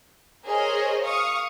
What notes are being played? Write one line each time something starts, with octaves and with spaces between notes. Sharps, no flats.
G#4 A#4 C5 C#5 D#5
F5 C#6 D#6